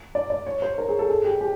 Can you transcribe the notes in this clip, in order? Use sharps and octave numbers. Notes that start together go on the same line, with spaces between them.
D5
D5
C#5
C5
A#4
G#4
A4
G#4
G4
G4